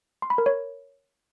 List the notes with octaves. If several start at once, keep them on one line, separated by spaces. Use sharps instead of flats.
C6
B5
A#4
C#5